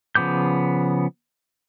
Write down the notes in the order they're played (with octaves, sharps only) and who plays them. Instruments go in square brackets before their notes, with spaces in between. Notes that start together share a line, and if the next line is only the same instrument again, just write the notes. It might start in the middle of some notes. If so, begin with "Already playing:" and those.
[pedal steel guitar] C#3 F3 B3 D6 G6